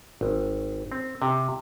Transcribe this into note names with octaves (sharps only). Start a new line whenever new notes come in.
G#1
C4
C3